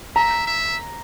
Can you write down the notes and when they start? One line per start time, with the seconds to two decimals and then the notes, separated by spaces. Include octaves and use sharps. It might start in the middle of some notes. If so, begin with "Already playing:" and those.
0.16 E5 A#5
0.47 E5